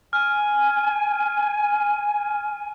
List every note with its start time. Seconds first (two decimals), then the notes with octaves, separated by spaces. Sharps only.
0.13 G#5 F6